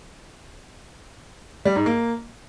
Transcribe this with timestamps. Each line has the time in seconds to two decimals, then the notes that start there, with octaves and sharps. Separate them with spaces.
1.65 G3
1.76 G#2
1.86 A#3